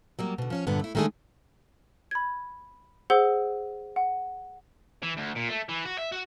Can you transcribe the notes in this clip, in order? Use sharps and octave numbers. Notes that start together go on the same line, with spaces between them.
F#3 G3 A#3
B2 D3
F3 C#4 C#5
G2 A#2 D3 B3
A3 E4
D#3 G#3 A3 D4 G#4
B5 G#6
G#4 C5 F#5 E6 G7
F#5
E3
D2
A#2
A3
E3
F#4
E5
F#4